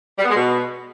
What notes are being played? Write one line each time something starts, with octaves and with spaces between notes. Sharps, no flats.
G3
B3
G#3
B2